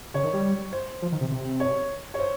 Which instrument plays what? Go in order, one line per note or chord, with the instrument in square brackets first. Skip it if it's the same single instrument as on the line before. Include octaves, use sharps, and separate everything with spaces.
[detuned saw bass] C#3 [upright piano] C#5
[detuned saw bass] D#3
G3
[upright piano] C5
[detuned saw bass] F3
D#3
C3
C3
[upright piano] C#5
C#5
C5